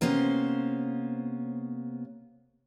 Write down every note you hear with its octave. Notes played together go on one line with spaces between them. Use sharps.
C3 A#3 B3 C#4 C5